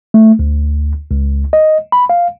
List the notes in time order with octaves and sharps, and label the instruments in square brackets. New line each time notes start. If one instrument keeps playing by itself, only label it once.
[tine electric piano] A3
D2
C#2
D#5
B5
F5